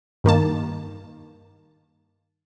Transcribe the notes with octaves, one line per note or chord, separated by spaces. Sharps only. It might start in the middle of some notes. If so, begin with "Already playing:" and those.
G2 D#3 A#3 A5